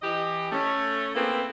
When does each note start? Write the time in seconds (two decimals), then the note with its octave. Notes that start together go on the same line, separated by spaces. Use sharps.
0.02 E3 G4 D#5
0.52 A3 C#4
1.15 A#3 C4 E4 G#4 A4 B4